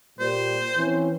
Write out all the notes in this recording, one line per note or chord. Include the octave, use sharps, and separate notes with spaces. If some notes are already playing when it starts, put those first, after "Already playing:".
A#2 G3 C5
E3 C4 C#4